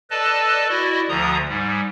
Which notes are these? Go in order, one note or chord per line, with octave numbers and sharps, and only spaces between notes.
A4 B4 D5 D#5 A5
E4 F#4 D5 D#5
D2 D3 F3 A#5 D#6
G#2 G3